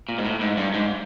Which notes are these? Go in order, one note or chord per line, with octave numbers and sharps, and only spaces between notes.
A#2
G#2
A2
G#2
G2
G#2